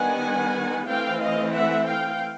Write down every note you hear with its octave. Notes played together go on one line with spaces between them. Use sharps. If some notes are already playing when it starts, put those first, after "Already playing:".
Already playing: D#3 G3 B3 D4 F#5 G#5
E3 A3 C4 F5 G5
D#5 F5
E5 F#5
F5 G5